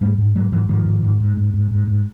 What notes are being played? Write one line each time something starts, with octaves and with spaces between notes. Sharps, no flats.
G#2 G3 A3
G#2
G#2 F#3 G#3
G#2 E3 F#3
G#2 D#3 F3
G#2
G#2
G#2
G#2
G#2
G#2
G#2